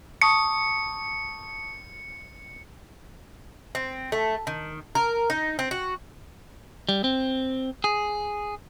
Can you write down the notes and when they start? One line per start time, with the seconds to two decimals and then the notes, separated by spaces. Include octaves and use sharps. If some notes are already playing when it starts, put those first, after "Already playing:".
0.22 A5 C#6 D#6 C#7
3.75 C4
4.12 A3
4.47 D#3
4.95 A#4
5.30 D#4
5.59 C4
5.71 F#4
6.89 G3
7.04 C4
7.84 G#4